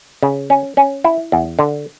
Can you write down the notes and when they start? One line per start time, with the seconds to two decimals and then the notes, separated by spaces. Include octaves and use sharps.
0.23 C#3
0.50 C#4
0.77 C#4
1.04 E4
1.32 E2
1.59 D3